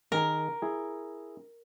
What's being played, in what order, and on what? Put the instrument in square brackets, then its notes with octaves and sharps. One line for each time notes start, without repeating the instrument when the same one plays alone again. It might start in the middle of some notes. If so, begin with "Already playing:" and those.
[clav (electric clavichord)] D#3 G#4 [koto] A#4
[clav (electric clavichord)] E4 G#4